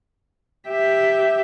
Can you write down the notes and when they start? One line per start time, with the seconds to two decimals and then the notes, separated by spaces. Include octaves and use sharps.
0.68 G4 E5